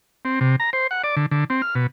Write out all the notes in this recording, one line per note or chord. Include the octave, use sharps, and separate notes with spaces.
C4
C3
A#5
C5
F#5
D5
D3
D3
C4
F6
B2